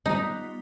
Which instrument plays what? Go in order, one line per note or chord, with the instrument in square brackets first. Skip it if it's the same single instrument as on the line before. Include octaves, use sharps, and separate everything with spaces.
[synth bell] G3 B3 F4 [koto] D#4